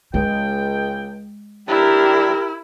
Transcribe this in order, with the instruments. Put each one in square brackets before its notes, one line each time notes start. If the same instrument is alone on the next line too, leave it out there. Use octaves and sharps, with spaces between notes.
[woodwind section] C#2 G5 [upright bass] G#3
[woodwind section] D4 [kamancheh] E4 [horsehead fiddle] G4 A#4